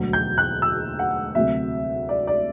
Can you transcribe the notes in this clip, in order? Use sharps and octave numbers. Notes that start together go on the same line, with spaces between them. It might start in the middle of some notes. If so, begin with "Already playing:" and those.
Already playing: E1 D2 D3 F#3
G6
F#6
E6
F#5
D2 C3 F#3 E5
D5
D5